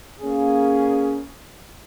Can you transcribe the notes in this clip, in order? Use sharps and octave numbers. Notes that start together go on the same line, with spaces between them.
A#3 C#4 G#4